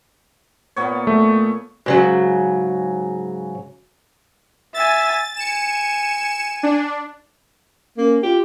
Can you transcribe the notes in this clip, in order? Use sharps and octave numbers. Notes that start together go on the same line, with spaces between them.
A#2 B3 C#5
A3
G#2 C#3 F#3
E5 G#5 A6
G#5 C#7 E7
D4
A#3 C#4
F4 G4